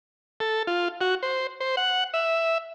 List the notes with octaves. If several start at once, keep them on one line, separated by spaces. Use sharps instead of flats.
A4
F4
F#4
C5
C5
F#5
E5